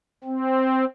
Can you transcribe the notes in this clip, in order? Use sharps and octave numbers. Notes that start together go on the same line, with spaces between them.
C4